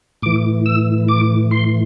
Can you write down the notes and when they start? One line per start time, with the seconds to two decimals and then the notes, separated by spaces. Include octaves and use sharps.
0.22 A2 E3 D6
0.66 E6
1.08 D6
1.51 C6